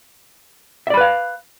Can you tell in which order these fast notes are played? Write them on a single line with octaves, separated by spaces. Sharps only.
E5 D5 B5 B4 F5